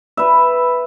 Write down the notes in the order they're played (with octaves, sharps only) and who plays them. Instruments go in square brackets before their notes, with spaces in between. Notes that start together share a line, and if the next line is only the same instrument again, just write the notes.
[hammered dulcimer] B4 E5